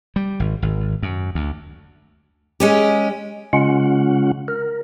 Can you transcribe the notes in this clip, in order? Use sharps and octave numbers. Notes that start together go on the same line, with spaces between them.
G3
G#1
G#1
F#2
D2
G#3 C#4 G4
C#3 G#3 C#4 F4 F#5
A#4